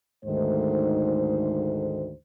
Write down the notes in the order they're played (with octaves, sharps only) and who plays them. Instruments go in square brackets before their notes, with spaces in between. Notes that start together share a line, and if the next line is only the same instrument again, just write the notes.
[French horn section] D2 G#2 D#3 A3 C5